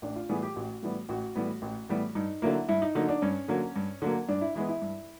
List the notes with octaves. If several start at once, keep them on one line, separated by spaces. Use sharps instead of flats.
A1 D4
F4
A2 E3 G3 B3 G#4
G4
A1 F#4
A2 E3 G3 B3
A1 F#4
A2 E3 G3 B3
A1
A2 E3 G3 B3
G2 D#4
D3 F#3 A#3 E4
G2 E4
D#4
D3 F#3 A#3 D#4
D4
G2 C#4
D3 F#3 A#3
G2
D3 F#3 A#3
G2 D4
E4
E3 G#3 B3 E4
E4
G2